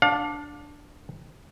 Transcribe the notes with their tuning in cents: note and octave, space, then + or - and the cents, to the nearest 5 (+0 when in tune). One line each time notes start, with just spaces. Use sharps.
D4 +0 F5 +35